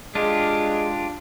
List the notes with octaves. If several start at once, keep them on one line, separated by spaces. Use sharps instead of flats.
G#3 D4 F4 G4